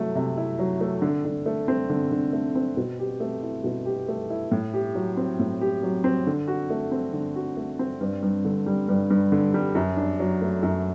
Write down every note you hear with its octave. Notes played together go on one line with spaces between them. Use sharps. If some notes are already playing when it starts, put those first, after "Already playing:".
Already playing: C3 F#3 A3 E4
C3
E4
F#3
A3
D3
D3
A3
C4
D3
D3
A3
C4
B2
G4
A3
E4
B2
G4
A3
E4
A2
G4
F#3
C4
A2
G4
F#3
C4
D3
F#4
A3
C4
D3
F#4
A3
C4
G2
G2
D3
G3
G2
G2
D3
G3
F#2
D4
F#3
A3
F#2